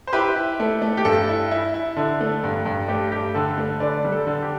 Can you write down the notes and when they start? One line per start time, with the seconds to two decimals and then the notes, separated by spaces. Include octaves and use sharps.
0.07 C5
0.13 E4 G4 B4
0.36 E4
0.60 A3
0.82 A3
0.97 G4
1.05 G2 A4
1.29 E4
1.51 E4
1.74 E4
1.96 D3
2.21 A3
2.44 G2
2.65 G2
2.88 A3 G4
3.12 G2 G4
3.34 D3 A4
3.57 A3
3.80 D3 B4 D5
4.05 G3
4.12 A4
4.27 D3
4.42 G4